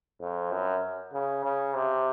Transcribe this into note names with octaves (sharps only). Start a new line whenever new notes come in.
F2
F#2
C#3
C#3
C3